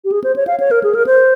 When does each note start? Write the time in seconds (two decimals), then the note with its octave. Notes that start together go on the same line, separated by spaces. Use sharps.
0.05 G4
0.12 G#4
0.24 C5
0.36 C#5
0.47 F5
0.60 C#5
0.71 A#4
0.84 G#4
0.95 A#4
1.07 C5